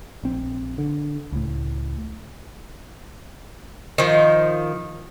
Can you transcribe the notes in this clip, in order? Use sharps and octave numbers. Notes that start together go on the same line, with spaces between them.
A#1 C4
D3
C#2 A2
D#3 F3